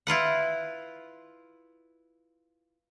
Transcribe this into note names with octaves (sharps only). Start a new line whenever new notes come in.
E4 F4 B4 F#5